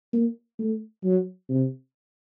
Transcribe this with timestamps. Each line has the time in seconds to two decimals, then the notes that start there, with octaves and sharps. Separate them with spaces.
0.13 A#3
0.59 A3
1.04 F#3
1.49 C3